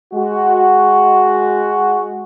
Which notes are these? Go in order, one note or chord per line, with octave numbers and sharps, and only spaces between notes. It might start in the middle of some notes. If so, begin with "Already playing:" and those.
G#3 F#4